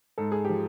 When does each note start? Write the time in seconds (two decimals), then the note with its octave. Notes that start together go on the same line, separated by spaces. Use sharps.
0.18 G#2 A4
0.32 G#4
0.45 F3 G4